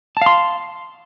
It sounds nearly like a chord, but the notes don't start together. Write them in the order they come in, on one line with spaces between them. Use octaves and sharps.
A5 F5 C6